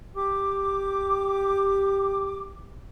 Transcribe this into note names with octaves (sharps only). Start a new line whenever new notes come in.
G4 D6